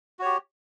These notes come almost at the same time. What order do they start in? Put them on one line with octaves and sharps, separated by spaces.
F#4 C#5 G4